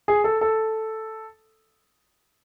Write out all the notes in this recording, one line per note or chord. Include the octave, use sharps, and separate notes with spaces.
G#4
A4
A4